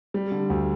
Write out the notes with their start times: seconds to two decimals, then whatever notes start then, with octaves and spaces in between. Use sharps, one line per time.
0.14 G3
0.32 D3
0.50 D2